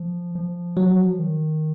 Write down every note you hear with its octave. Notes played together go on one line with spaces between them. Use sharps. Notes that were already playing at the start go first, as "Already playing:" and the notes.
Already playing: F3
F3
F#3
D#3